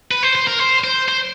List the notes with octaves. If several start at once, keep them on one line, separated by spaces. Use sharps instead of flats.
B4
C5
C5
A#4
C5
C5
C5